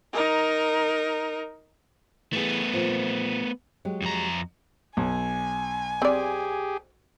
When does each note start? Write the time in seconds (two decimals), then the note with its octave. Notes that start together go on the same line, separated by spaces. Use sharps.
0.13 D#4 A#4
2.33 E3 A3 B3 G#4
2.73 A#2 F3
3.85 F#3 G#3 G4
4.02 F2 A#5
4.97 B1 G#5
6.02 C4 G4 G#4 D5